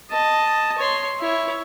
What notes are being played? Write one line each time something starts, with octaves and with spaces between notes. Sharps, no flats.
D#5 A5
C#5 C6
E4 C#5